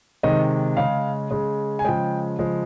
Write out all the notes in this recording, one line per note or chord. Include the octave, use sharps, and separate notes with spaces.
C3 D#3 G#3 D#5
C#3 G#3 F5
C#3 G#3
G#5
C#3 F3 G#3 G5
C#3 F3 G#3